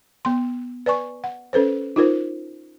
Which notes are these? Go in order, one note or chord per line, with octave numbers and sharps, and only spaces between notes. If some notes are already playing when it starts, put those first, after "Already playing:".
B3 C6
B4 D5 G#5 C#6
F#5
C#4 A4 B4 C5
D#4 F4 A#4 C5